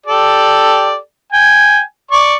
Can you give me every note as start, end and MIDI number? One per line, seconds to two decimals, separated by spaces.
0.06 0.96 67
0.06 0.96 69
0.06 0.96 74
1.33 1.81 79
1.33 1.81 80
2.11 2.35 74
2.11 2.35 85